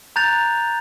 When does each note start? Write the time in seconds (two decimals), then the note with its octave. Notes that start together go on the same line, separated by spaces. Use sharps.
0.16 A#5 F#6 G6 A6 F7